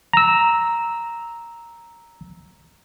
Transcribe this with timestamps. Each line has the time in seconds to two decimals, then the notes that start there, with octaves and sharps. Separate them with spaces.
0.13 A#5 E6